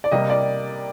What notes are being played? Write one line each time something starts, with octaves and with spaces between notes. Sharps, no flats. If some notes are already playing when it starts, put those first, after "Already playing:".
D5
C3 G3 A#3 D#5
D5